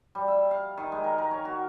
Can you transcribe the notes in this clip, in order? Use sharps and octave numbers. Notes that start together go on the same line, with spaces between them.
G3
E5
F5
D#3
G#3
A#4
A#4
C#5
F#4